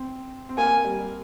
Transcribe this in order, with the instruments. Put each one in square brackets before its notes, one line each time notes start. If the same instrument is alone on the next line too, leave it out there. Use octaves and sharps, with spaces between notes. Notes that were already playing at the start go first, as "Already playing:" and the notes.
Already playing: [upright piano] C4
C4
[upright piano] A#3 [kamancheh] G#5
[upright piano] G3